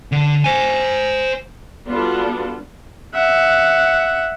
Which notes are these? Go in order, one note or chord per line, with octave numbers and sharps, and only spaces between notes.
D3
C5 G#5
G3 B3 D4 F4 F#4 A4
E5 F#5